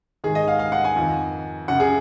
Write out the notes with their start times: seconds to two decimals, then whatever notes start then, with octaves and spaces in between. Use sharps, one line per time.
0.24 D#3 G#4
0.27 G#2
0.35 D#5
0.48 F5
0.59 F5
0.72 F#5
0.84 G#5
0.96 F2 D#3
1.68 F#2 C#3 F#5
1.80 G#4